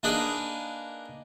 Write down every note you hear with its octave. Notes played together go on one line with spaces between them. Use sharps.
A#3 D4 D#4 G#4 B4